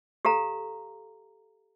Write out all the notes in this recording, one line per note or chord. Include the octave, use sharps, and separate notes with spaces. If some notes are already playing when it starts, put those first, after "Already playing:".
G4 A4 F5 A#5